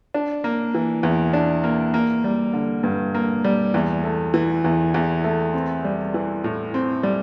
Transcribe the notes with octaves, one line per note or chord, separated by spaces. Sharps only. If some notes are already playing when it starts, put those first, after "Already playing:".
D4
A#3
E3
E2
D4
A#3
A#3
G3
D3
G2
A#3
G3
E2
A3
E3
E2
E2
A3
C4
G3
E3
A2
C4
G3